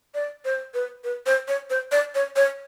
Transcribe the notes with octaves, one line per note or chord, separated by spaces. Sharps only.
D5
C5
B4
B4
C5
C#5
C5
D5
C#5
C#5